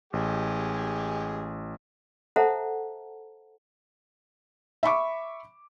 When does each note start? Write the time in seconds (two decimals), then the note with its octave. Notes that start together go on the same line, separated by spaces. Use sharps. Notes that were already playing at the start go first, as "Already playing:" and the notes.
0.13 A1 G#3 G4 G#4
2.36 A4 C5 E5 F#5 A5 A#5
4.83 E5 B5 C#6 D6